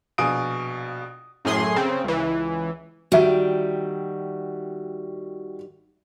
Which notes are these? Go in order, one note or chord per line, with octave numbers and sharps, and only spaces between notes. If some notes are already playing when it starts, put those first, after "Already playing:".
A#1 B2 G#4 F5 D#6 D7
F#2 A2 G#4 C6
C#3 C4
C#2 E3
D#3 G3 F#4 E5